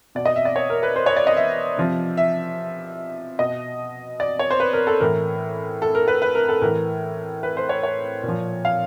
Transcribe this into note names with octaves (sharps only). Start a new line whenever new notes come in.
B2 D5
D#5
E5
D5
C#5
A#4
B4
C5
C#5
D5
D#5
E5
C3 F3
E5
B2 D#5
D5
C#5
C5
B4
A#4
A4
A2 E3 A#4
A4
A#4
B4
B4
A#4
A4
A2 E3 A#4
B4
C5
C#5
C#5
A#2
F3
F5